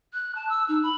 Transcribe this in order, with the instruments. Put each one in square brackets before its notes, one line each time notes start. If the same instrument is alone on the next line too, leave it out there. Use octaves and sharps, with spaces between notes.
[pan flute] F#6
A5
E6
D#4
B5